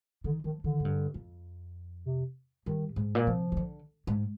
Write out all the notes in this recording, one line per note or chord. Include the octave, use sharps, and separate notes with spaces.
D3 D#3
D#3 F3
D3 D#3
G#2
G2
F2
C3
G2 D#3
G#2
A#2
C3 F3
C3
D3
G#2